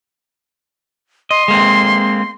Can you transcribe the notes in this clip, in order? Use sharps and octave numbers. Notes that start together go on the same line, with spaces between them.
D#5 C6
G#3 A#3 C4